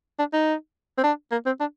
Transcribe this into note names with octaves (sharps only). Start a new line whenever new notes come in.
D4
D#4
C4
D4
A#3
C4
D4